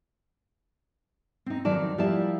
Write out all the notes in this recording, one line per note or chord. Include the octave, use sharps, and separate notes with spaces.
C4 D#4
F2 D#3 F#3 D5 A5
F3 G3 A#3 E4 D5 A5